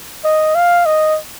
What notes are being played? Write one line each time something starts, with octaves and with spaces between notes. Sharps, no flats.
D#5
F5
D#5